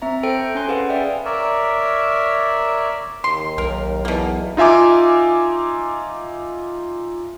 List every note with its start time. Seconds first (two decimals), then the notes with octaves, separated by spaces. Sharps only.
0.02 C4 E5 A#5
0.23 A4 C5 G5 D7
0.55 C#4 G#5 C6
0.69 G#4 B4 F5 F#5
0.89 D5 E5 G5 G#5
1.25 A#4 C#5 D5 E5
3.24 D#2 C6
3.58 B1 A#4
4.05 E2 B2 A#3
4.57 D#4 F4 E5 G#5 D6